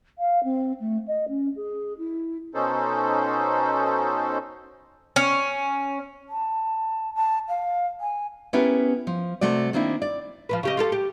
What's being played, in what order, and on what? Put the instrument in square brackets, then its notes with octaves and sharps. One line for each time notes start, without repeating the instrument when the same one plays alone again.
[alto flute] F5
C4
A3
D#5
C#4
G#4
E4
[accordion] B2 C#4 D#4 A4 C5
[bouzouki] C#4
[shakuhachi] A5
A5
F5
G#5
[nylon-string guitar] B3 C#4 E4 G4 A#4 B4
F3
C3 A3 F#4 D5
D#3 A#3 C4 D4 E4
D5
[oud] F3 F#3 B4
C#3 G4 D#5
F4 G4 A4
G4